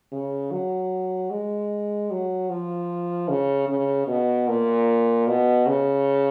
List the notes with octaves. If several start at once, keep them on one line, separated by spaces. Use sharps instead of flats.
C#3
F#3
G#3
F#3
F3
C#3
C#3
B2
A#2
B2
C#3